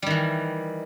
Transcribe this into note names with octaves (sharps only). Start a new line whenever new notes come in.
D#3 E3 G3